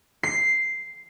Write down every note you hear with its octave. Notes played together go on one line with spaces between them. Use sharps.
C7